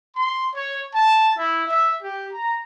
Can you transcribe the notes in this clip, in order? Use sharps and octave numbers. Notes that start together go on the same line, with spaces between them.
C6
C#5
A5
E4
E5
G4
A#5